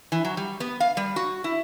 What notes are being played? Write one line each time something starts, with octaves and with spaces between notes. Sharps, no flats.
E3
F#3
G3
B3
F5
G3
F#4
E4